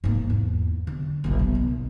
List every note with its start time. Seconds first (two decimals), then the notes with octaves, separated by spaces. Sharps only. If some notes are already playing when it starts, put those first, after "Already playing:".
0.04 G#2 A#3
0.30 E2
0.87 D3
1.24 F#1 B1
1.39 B3
1.55 B1